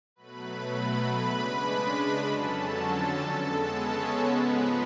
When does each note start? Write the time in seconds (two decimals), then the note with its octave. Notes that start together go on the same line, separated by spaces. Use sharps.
0.16 B2 F#3 A3 B4 B5
0.67 B4 B5
1.17 C#3 G#3 D4 B4 B5
2.19 F2 D3 F#3 C#4 A4 A5
2.69 A4 A5
3.20 C#3 G#3 B3 A4 A5
3.71 C#4 C#5
4.22 G#2 F3 G#3 B3 B4